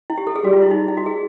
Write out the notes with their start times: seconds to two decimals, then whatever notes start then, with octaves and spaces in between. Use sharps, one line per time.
0.10 E4
0.18 G4
0.27 A4
0.36 G#4
0.44 G3 F#4
0.53 F4
0.62 E4
0.71 D#4
0.88 E4
0.97 F#4
1.06 G#4